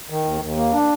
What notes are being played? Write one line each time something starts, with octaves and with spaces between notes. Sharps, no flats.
D#3
D#2
D#2
A#3
D4